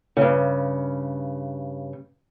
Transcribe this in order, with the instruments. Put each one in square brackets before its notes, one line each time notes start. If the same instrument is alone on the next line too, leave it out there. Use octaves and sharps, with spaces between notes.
[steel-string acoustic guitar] G2 C#3